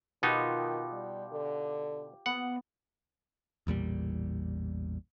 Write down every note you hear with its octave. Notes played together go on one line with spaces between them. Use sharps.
B2 D#3 B3 D#4 F4 G4
G3
D3
B3 F#5
A1 E2 A#2 G3